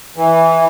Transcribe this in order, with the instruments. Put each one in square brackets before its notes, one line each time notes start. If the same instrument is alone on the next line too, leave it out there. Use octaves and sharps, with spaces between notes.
[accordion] E3